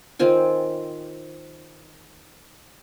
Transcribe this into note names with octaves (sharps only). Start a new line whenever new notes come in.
D#3 C4 F4 G#5